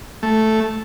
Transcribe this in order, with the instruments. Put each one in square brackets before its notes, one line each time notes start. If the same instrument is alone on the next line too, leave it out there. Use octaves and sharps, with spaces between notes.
[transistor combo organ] A3